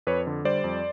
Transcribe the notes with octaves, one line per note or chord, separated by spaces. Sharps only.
F2 B4 C#5
D3
G3 C5 D5
F2